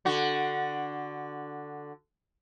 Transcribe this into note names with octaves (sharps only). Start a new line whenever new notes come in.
D3 F#4